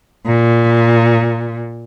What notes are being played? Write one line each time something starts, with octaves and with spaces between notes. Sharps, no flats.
A#2